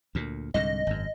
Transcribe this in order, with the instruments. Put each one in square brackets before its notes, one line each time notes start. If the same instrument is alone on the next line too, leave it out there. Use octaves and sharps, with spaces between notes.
[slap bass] D2 A#2
[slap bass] C2 G#2 D3 [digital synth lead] D#5
[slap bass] G#1 F#2